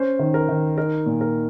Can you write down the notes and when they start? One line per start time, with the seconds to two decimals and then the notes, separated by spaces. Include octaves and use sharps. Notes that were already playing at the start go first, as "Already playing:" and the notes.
Already playing: C#4 C5
0.19 D#3
0.34 A#4
0.49 D#3
0.78 D#4 A#4
1.06 A#2
1.21 A#4